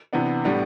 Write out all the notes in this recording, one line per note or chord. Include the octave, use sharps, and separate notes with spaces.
C3 E3 B3 D4
A2 G3 B3 D4